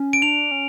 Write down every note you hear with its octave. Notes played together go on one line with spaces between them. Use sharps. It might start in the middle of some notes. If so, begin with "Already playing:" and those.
Already playing: C#4
D7
D4 F7
C#4